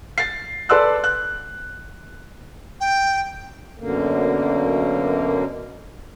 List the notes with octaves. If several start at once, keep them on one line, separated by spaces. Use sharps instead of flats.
A6 C7
A4 B4 D5 C6 E6 F#6
F#6
G5
F#2 B2 D3 A#3